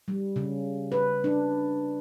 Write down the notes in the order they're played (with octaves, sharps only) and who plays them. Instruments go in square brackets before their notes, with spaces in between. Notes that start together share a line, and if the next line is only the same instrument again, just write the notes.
[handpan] G3
C#3
B4
D4